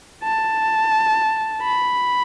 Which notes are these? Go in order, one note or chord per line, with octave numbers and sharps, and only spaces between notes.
A5
B5